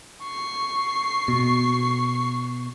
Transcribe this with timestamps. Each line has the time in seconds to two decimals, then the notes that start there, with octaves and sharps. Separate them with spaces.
0.23 C#6 C7
1.28 B2